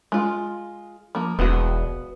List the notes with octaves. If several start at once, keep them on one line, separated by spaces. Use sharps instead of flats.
G#3 F4
F3 A#3
E1 B3 F#4